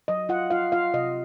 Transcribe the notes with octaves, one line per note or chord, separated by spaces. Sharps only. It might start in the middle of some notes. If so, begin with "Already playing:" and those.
F#3 D#5
F4 F#5
F4 F5
F4 F5
C3 D#5